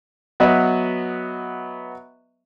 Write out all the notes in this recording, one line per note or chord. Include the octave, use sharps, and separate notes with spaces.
F#3 B3 B4 D#5 E5